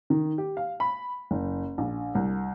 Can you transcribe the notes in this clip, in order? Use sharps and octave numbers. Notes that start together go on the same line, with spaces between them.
D#3
G4
F5
B5
F#1
A#1
C2